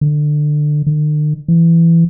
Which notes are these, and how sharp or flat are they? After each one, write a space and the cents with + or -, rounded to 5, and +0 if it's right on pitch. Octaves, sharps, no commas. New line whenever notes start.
D3 +20
D3 +45
E3 +15